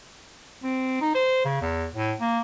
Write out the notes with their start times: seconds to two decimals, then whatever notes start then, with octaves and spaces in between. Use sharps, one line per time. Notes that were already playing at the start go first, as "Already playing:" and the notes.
0.63 C4
1.01 D#4
1.15 C5
1.45 C#3
1.62 E2
1.95 A2
2.21 A#3